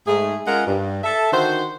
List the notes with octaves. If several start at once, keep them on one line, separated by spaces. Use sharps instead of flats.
G#2 A3 G#4
G#3 C#4 F4 A#4 D#5 F#5
G2
A4 E5
D3 D#3 F#4 C5